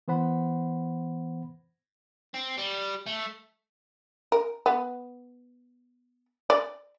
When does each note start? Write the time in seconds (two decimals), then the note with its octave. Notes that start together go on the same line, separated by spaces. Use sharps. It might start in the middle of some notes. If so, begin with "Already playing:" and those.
0.08 E3 B3 C5 F#5 B5
2.34 C4
2.58 G3
3.06 A3
4.32 A#4
4.66 B3
6.50 D5